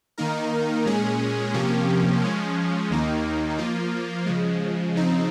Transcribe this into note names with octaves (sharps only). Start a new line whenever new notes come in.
D#3 A#3 D#4 A#4
A#2 G#3 C#4 G#4
C3 F3 A#3 C#4 G4
F3 G#3 C#4
D#2 D#3 A#3 D#4
F3 A#3 F4
C#3 F3 G#3
C#3 F3 C4 D#4